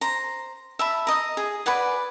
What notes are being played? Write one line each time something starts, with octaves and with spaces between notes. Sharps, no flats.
C5 A#5
E5 A5 B5
D#5 A#5
G#4
B4 D5 F#5 G#5